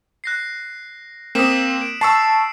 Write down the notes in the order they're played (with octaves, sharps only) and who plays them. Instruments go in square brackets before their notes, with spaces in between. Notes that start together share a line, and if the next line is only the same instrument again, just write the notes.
[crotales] F#6 A#6 C7
[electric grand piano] A#3 C4 [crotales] D#6 B6 E7
[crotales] D7
[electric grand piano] A5 C#6 E6 [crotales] C7